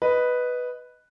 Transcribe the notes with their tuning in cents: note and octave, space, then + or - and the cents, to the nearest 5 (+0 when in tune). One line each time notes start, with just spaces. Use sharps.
B4 +0 D#5 +0